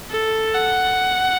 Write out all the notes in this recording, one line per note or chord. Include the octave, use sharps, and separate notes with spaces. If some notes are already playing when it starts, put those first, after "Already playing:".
A4
F#5